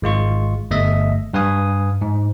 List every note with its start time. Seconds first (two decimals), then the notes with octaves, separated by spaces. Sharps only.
0.02 G#1 G#3 F4 C#6
0.71 G1 A3 D#5 E5
1.34 G2 B4 F5 G#5 D#6
2.01 G#2